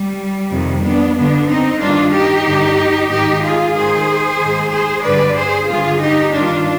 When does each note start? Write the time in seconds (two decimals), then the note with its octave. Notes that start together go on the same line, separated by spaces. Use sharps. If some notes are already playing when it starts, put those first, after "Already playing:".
Already playing: G3
0.52 F2 C3 D#3
0.85 B3 D4
1.16 G2 D3 B3 D4
1.49 C4 D#4
1.81 G2 D#3 D4 F4
2.13 D#4 G4
2.46 G2 D3
3.10 G#2 D#3 D#4 G4
3.43 F4 G#4
3.76 G#2 D#3 G#4 C5
4.41 G#2 D#3
4.72 G#4 C5
5.04 G2 D3 B4 D5
5.36 G#4 C5
5.69 G2 D3 F4 G#4
6.02 D#4 G4
6.34 G2 D#3 D4 F4